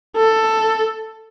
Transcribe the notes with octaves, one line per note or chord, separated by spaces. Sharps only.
A4